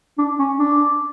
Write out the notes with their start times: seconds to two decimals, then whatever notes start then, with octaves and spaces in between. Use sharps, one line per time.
0.18 D4
0.39 C#4
0.59 D4